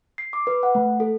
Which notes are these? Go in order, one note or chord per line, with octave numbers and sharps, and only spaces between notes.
C7
D6
B4
F#5
A3
A4